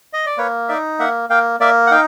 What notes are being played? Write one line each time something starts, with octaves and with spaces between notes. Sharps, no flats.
D#5
D5
A#3 B4 C#5
D#4 D5 E5
A#3 E5 F#5
A#3 F5 G5
A#3 D5 E5
F#5
D#4 F5 G5